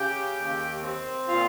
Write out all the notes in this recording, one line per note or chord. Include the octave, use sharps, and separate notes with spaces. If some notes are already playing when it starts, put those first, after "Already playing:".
Already playing: C#3 G4 G5
D#2
C4
A#2 F4 F5